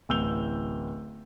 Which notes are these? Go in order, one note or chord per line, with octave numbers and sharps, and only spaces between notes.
D1 A1 E6 G6 F7 G7